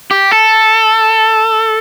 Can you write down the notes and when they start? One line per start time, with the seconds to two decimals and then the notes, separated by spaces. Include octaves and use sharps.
0.11 G4
0.31 A4